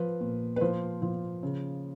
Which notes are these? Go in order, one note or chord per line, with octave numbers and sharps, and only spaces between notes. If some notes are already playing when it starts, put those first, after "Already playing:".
Already playing: F3 B4
A#2
B4
F3 C5
F3
C#3